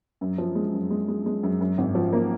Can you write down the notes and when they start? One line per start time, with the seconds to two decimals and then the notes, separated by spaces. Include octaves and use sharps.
0.21 F#2
0.38 F3
0.55 G#3
0.74 F#2
0.91 G#3
1.08 G#3
1.26 G#3
1.43 F#2
1.61 F#2
1.78 G#1
1.95 F3
2.13 A#3